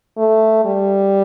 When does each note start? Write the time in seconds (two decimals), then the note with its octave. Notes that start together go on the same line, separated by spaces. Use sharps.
0.18 A3
0.65 G3